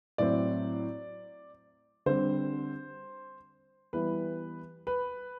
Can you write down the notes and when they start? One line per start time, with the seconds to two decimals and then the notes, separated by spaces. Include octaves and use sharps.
0.18 A2 F#3 C4 E4 D5
2.06 D3 G3 C4 C5
3.93 E3 G3 B3 E4 B4
4.87 B4